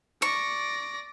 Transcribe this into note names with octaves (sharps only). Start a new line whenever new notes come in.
D5 C#6 A#6